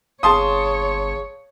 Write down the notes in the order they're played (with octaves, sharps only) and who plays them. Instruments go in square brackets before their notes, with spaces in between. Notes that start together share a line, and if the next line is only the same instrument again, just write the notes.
[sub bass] G1 [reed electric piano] G#4 F5 [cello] C#5 [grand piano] A5 C6 D#6